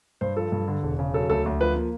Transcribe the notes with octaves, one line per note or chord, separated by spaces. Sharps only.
G2 C5
F3 A4
G2
D3
E1
C#3
F#3 A4
D2 A4
D2
F3 B4
A#3